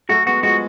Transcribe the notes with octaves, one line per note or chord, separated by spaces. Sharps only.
F#3 A3 F#4
G#3 B3 F#4
F3 G#3 F#4